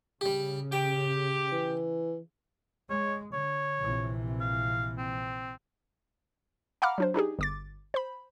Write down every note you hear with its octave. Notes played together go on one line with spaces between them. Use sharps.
C#3 G3 G4
G4 G5
E3
G#3 C#5
D3 C#5
A#1 C3 E3
F5
C4
F5 F#5 A#5 B5 D6 F6
F#3 D4 C5
D4 D#4 G4 G#4
G1 D6 A6
C5 B5